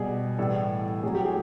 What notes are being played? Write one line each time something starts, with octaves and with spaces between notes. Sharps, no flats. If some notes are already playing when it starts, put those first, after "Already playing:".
Already playing: B2 G3 G#4
A2 E3 G3 A4
A2 F#3 G#4
G4
G#4